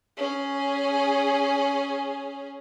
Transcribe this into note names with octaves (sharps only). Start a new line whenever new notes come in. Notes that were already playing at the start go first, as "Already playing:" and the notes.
C#4 G#4